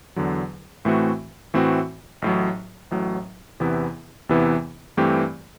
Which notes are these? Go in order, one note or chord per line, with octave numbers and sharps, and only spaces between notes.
E2 D3 F#3
A2 E3 A3 C4 F#4
A2 E3 A3 C4 F#4
A1 A2 F#3
A1 A2 F#3
E2 C3 E3 B3 E4
E2 C3 E3 B3 E4
G2 E3 A3 C4 G4